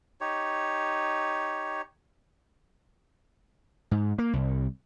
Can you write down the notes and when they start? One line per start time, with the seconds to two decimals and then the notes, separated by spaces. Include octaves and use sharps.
0.21 D#4 G4 C#5
3.91 G#2
4.18 A#3
4.33 C2